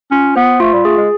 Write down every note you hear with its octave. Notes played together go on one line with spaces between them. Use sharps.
C#4 F4
B3 C5
A3 F4
G3
A3 G#4
G#3